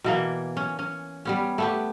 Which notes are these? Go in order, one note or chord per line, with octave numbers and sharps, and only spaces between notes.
B2 E3 A#3
C#4
C#4
G3 B3 C#4
A3 B3 G4